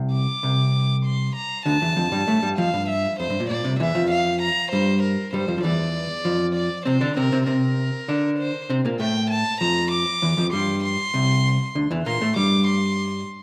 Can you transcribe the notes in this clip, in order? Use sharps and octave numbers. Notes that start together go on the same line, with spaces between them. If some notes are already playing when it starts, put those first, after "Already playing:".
Already playing: C2 C3
D6
C2 C3
C6
A#5
D2 D3 A5
E2 E3
F2 F3
G2 G3
A2 A3
G2 G3
F2 F3 F5
G2
E5
F2 C5
G2
A#2
A#2 D5
C2 C3
E2 E3 E5
F2 F3
F5
A#5
G2 G3 C5
A#4
G2 G3 C5
F2 F3
F3
E2 E3 D5
F2 F3
D5
C3 C4 C5
D3 D4
C3 C4 A#4
C3 C4
C3 C4 A#4
D3 D4
C5
C3 C4
A#2 A#3
A2 A3 G5
A5
F2 F3 A#5
D6
E2 E3
F2 F3
G2 G3 C6
C6
C2 C3
D2 D3
E2 E3
A#2 A#3 C6
A2 A3
G2 G3 D6
C6